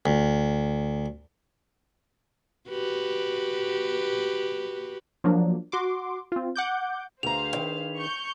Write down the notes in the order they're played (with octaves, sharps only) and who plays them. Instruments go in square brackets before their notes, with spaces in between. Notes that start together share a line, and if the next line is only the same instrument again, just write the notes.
[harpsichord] D2
[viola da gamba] F#4 G4 B4
[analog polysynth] F3 F#3 A#3 D4
F#4 C6 D6
C4 F4
F#5 D6 G6
[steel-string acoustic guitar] D2 A#5 [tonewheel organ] D4 G#4 B4 [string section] C5 F5 [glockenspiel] F7
[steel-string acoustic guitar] D#3
[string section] C#6 G6